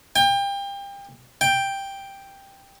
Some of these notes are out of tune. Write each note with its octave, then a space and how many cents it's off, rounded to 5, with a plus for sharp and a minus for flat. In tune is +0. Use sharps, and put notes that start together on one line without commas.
G5 +30
G5 +5